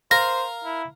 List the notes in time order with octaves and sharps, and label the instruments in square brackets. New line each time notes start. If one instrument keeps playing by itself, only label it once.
[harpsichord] A#4 F5 [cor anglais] C5 [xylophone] A#6
[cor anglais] E4